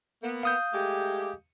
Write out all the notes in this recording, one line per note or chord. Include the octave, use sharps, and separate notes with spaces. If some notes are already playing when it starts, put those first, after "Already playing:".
A#3 B3
F5 D#6 G6
G#3 A3 G4